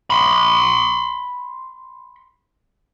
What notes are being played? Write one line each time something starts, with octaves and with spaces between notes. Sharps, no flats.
B5 C6